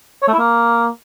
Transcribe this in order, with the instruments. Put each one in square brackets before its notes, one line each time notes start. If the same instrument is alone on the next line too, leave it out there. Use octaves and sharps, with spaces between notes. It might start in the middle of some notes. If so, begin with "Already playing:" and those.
[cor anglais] C#5
A3
E4
A#3